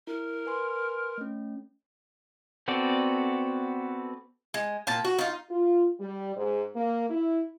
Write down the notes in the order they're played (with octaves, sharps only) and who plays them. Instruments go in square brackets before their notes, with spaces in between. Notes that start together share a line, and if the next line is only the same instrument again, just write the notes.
[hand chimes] E4 [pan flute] A#4
[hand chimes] B4 G#5 C6
A3 C#4
[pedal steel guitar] B3 C4 F#4 A4 D5
[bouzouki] G#3
A#2 G5 A5
F#4
D#4 F4
[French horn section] F4
G3
G#2
A#3
E4